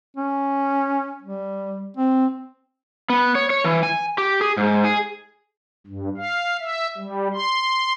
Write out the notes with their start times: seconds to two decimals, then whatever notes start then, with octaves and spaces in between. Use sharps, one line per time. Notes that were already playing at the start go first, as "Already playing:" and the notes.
0.16 C#4
1.22 G3
1.97 C4
3.10 B3
3.35 C#5
3.50 C#5
3.64 E3
3.83 G#5
4.18 G4
4.41 G#4
4.57 G#2
4.84 G#4
5.87 G2
6.18 F5
6.60 E5
6.98 G3
7.34 C6